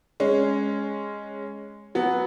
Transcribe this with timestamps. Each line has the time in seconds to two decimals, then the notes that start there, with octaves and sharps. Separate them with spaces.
0.20 G#3 C#4
1.95 F#3 B3